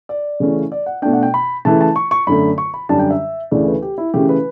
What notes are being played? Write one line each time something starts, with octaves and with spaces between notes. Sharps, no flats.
D5
C#3 E3 A3 C#4
D5
F#5
B2 A3 D4 G5
F#5
G5
B5
C#3 E3 A3 A5
A5
C#6
C#6
F#2 D3 A3 B5
C#6
B5
F#2 D3 G3 D4 A5
G5
E5
D2 C#3 E3 A3 D5
B4
G4
E4
C#3 E3 A3 C#4 G4
B4